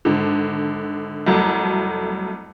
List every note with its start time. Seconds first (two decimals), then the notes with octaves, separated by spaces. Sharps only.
0.05 G#1 D3
1.27 C2 F2 F#3 A3